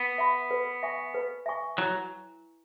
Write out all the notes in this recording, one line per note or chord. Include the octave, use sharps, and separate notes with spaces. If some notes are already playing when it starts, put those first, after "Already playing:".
Already playing: B3
E5 B5
B4
E5 G#5 C#6
B4
E5 G#5 C#6
F#3 E4